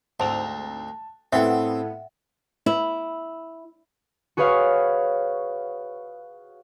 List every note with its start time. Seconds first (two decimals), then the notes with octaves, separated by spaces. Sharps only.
0.20 D2 G#2 C4 A5 A#5
1.33 A2 B3 C4 A4 E5 F#5 G5
2.66 E4
4.37 F#4 G#4 B4 C#5 F5